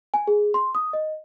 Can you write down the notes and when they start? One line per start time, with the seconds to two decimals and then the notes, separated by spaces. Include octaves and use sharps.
0.14 G#5
0.27 G#4
0.54 C6
0.75 D#6
0.93 D#5